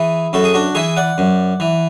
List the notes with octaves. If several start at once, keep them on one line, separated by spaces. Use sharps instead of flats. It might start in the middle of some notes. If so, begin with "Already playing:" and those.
Already playing: E3 E4 G#4
F#2 F#4 A4
G#4
D4 F#4
E3 E4 G#4
D5 F#5
F#2
E3